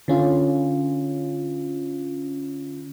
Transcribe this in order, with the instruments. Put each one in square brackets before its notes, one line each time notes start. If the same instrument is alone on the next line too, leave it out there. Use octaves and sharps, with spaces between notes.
[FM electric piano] D3 C#4 F4